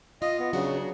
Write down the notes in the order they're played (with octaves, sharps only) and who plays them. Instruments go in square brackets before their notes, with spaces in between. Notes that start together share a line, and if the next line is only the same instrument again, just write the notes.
[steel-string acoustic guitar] F4 [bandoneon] D#5
[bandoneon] B3
[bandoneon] C#3 [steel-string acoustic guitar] F#3 D4 F#4